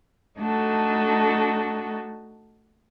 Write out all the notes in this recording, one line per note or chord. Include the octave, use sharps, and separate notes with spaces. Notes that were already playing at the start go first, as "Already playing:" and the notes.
A3 D4 D#4 F#4 A4